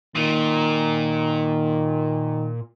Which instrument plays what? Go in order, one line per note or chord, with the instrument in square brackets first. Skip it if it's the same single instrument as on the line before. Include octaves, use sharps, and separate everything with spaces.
[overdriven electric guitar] A#2 [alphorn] D#3